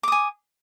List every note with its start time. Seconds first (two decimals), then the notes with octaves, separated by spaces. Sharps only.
0.03 D6
0.08 D#6
0.12 G#5